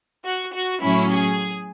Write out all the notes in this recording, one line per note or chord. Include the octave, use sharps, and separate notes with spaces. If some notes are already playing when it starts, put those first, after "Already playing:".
F#4
F#4
A2 F#3 C#4 E4
G#4